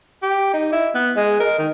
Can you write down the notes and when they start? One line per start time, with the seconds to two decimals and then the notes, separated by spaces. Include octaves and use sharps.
0.23 G4
0.54 D#4
0.72 E4
0.95 B3
1.17 G#3
1.40 A#4
1.59 D#3